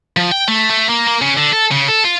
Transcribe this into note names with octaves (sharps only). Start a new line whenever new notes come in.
F3
G5
A3
A3
A#3
A#3
C#3
D3
A4
C#3
A4
F4